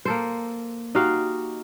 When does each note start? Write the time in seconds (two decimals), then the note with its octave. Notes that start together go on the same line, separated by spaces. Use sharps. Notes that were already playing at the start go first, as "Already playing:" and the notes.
0.05 A#3 A4 C5
0.95 D#4 F#4 G4 F5